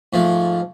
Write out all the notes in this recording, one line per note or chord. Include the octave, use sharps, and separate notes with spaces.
G#2 F3 A3